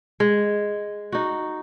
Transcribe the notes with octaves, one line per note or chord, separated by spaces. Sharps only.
G#3
D#4 F#4